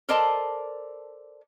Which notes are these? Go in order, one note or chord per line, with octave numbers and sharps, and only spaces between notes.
A4 A#4 C5 D5 D#5 A5